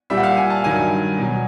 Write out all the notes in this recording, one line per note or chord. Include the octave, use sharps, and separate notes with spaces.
A#2 G3 E5
F#5
F5
G#5
A5
G2 D#3 F#3 G#5
B2 F#3